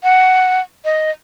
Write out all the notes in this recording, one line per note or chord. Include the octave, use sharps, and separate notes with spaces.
F#5
D#5